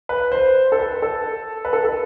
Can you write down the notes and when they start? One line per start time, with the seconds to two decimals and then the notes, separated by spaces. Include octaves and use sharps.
0.09 B4
0.32 C5
0.72 A4
0.79 B4
1.02 A4
1.65 B4
1.73 A4
1.85 A4